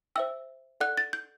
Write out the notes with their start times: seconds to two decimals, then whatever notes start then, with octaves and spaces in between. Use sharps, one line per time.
0.16 C5 E5 G5 E6
0.80 A4 D5 F#5 F#6
0.98 A6
1.13 G6